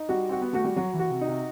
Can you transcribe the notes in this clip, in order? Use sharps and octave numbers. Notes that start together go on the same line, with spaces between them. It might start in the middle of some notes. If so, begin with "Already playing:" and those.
Already playing: D#4
G3 F#4
C4 F#4
B3
A3 F#4
G3
F#3 F#4
E3
F#4
C3
D#4
C3